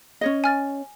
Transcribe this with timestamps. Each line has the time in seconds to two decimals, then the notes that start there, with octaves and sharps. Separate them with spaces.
0.21 C#4 C#5 D#5
0.44 G#5 F6 A6